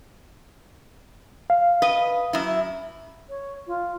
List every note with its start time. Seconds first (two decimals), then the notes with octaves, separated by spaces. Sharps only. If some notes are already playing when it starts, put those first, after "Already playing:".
1.50 F5
1.82 B4 D#5
2.33 F#2 E4
3.29 C#5
3.67 F4